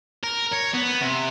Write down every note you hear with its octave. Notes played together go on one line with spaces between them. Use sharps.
A#4
C#5
B3
C3